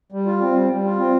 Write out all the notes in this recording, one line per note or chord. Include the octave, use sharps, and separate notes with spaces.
G3
F4
C4
G3
G3
F4
C4